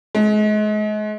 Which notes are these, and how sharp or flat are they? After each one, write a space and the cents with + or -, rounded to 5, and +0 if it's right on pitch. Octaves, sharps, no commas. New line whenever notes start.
G#3 +35